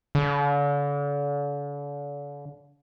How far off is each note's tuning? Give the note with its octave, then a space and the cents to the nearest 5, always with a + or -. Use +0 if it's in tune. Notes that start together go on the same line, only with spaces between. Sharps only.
D3 -40